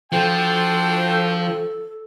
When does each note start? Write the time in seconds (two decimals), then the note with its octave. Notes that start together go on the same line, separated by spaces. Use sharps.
0.12 F3 D4 F#4 A4 C5 G5